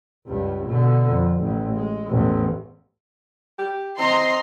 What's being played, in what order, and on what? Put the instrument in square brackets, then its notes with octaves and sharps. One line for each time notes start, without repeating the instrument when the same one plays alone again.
[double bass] C#2 G2
B2 D3
F2
A1
G#3
A1 E2
[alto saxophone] G4
[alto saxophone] C4 [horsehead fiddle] D#5 A#5 [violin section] C6